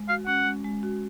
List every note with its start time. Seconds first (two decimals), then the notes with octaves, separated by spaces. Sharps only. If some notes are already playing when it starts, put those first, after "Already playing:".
Already playing: G#3
0.09 F#4 F5
0.27 C#4 F#5
0.46 G#3
0.64 G#3
0.83 F#4